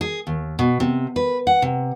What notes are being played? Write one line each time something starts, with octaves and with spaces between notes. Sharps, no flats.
G#4
D#2
B2
C3
B4
F#5
C3